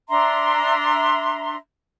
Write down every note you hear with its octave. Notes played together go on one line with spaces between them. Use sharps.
D4 E5 A#5 C6